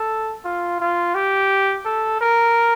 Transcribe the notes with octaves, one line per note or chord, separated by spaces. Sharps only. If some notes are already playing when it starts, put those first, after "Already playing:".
Already playing: A4
F4
F4
G4
A4
A#4